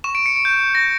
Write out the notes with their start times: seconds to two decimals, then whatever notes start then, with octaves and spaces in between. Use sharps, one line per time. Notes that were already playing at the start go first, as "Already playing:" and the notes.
0.04 C#6 E7
0.15 D7
0.26 C#7
0.36 D7
0.45 G6
0.75 A#6